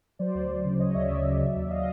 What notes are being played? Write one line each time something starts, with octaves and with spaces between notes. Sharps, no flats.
F#3 C5 D5
D2
D2
C#3
F#3 C#5 D#5
D2 D5 E5
D2
C#3
F#3
D#2
D#5 F5